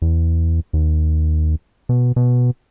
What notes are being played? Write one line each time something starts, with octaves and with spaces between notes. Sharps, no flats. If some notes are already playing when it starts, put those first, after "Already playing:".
E2
D#2
B2
B2